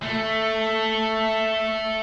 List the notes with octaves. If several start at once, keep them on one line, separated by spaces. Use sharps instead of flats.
A3